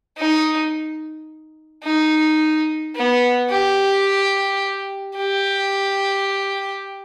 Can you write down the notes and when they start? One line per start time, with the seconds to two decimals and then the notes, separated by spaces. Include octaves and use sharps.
0.18 D#4
1.84 D#4
2.95 B3
3.51 G4
5.16 G4